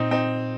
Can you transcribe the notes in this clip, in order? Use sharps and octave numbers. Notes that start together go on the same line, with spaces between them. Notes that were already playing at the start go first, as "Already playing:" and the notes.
Already playing: A#2 C4 D#4
C4 D#4